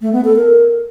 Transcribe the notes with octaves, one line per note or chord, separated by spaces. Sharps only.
A3
B3
A4
A#4